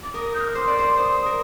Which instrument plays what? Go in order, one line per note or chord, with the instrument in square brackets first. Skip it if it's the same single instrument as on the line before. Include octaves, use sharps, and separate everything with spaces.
[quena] D6
[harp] A#4 [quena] D#6
[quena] G6
F6
D#6
[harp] C5 [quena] D6
[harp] D5
C5
[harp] C5 [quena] D#6
[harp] A#4